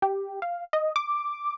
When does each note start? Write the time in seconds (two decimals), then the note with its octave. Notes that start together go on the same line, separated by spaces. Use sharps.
0.02 G4
0.42 F5
0.73 D#5
0.96 D6